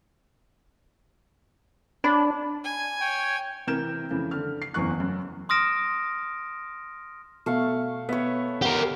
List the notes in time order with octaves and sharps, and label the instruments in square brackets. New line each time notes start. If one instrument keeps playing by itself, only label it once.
[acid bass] D4 [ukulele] C#5 B5
[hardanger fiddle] G#5
[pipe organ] C#5 [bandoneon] G5
[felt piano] C3 E3 A#4 G6 E7
F2 C#3 E3
D3 F6
C7
F#1 E2 E3 C#6 F#6
F#2
[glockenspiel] C6 D#6 F6 A#6 D7 E7
[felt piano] B2 [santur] A3 F5 C#6
[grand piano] B3 [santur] C#5 E5
[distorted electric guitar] G4 A#4 [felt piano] F#5 C7